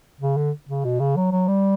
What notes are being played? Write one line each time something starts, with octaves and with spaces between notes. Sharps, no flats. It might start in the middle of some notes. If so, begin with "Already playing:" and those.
C#3
D3
C#3
B2
C#3
F#3
F#3
G3